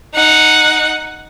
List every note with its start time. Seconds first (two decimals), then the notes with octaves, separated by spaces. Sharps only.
0.14 D#4 F#5